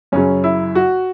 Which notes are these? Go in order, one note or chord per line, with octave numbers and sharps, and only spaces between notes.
F#2 C#3 F#3 C#4
E4
F#4